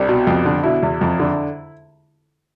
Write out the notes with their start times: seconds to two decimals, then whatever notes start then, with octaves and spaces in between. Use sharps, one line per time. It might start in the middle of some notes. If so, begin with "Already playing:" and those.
Already playing: C2 D4
0.08 B2
0.27 F2
0.45 D3
0.63 B2 E4
0.83 E2
1.01 F2
1.20 D3